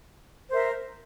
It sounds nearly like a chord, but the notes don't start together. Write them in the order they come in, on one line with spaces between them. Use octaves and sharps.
C5 A#4 E5